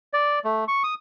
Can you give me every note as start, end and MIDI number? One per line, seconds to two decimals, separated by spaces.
0.13 0.39 74
0.44 0.64 57
0.68 0.83 85
0.84 0.94 87